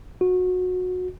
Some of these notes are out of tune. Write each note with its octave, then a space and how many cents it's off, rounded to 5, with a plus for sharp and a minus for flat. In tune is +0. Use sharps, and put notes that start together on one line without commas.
F#4 -20